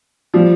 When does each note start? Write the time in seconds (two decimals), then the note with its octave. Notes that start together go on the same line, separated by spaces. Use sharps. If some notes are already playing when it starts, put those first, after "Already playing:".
0.34 F3 G3